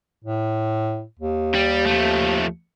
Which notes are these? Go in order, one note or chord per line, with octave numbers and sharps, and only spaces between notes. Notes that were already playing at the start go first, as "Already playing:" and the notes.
A2
D#2
G3
F3 A3